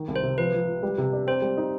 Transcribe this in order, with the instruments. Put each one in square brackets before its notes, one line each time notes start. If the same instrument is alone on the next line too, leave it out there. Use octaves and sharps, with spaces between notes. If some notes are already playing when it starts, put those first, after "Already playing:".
Already playing: [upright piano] D#3
C2
[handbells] C5
[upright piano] C3
[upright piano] F3 [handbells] B4
[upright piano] F3
F3
G3
C3
D4
[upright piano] C4 [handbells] C5
[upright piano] G3
D#4